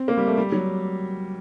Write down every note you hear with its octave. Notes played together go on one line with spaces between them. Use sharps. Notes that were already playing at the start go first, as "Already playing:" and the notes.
Already playing: C4
A#3
G3
A3
G3
F#3